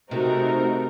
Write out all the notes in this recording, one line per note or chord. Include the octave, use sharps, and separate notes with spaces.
C3 A3 C4 D#4 F#4 A#4